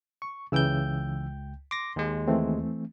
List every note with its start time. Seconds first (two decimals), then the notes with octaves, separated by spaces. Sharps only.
0.22 C#6
0.52 C#2 C#3 E3 G5 E6 G6
1.71 C6 D6 A#6
1.96 D#2 G#3
2.28 E3 A3 C4